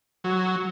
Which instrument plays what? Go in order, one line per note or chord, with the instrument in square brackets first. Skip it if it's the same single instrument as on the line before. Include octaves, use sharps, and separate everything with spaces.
[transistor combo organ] F#3